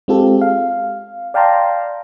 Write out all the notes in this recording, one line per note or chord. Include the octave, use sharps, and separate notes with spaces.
G#3 C4 F4 G4 A4
F5
D5 F5 G5 A5 A#5 C6